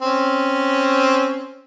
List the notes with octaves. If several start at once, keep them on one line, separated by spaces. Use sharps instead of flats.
C4 C#4